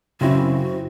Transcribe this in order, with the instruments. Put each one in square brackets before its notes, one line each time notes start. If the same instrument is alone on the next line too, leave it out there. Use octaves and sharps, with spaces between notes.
[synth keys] F#2 C4 E4 [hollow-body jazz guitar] C#3 [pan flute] F#4